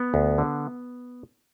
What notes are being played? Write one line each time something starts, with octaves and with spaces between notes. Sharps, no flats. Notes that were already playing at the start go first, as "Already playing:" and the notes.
Already playing: B3
D2
D3